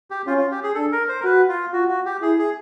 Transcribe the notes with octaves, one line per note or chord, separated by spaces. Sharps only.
G4
C#4 F4
F4
G4
G#4
D4 A4
A#4
C5
A#4
F#4 B4
F4
F4 F#4
F#4
G4
E4 G#4
G#4